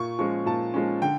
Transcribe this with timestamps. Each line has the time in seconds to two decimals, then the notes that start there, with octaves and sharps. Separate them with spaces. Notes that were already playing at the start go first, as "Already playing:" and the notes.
Already playing: A#2 C#6
0.19 F3 G#3 C#4 C#6
0.46 A#2 A5
0.74 F3 G#3 C#4
1.02 D3 G5